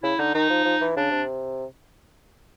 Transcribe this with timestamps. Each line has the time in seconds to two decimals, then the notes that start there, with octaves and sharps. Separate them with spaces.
0.03 C#3 E4
0.19 D3 D#4
0.35 D#3 D#4
0.50 F3
0.65 F3
0.81 E3
0.96 C#3 D4
1.11 C3